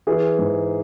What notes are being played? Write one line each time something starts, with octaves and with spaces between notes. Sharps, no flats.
E3 G#4
G#2